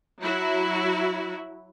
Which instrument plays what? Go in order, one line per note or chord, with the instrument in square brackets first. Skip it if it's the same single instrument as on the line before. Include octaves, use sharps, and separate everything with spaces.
[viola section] F#3 E4 F#4